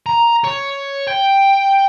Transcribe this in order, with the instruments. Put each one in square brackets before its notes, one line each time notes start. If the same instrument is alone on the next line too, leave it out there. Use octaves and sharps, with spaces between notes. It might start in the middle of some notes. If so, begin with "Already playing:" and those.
[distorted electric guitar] A#5
C#5
G5